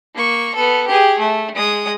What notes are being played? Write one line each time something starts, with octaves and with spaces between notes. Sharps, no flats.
A#3 C#6
B3 A4
G4 G#4
A3
G#3 D#6